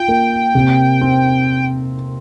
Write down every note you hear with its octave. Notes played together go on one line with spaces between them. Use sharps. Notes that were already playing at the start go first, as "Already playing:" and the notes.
Already playing: F4 G5
A#3
C3
C4